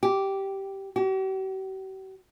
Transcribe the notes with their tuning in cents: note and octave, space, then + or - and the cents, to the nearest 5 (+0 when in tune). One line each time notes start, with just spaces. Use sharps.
G4 -10
G4 -45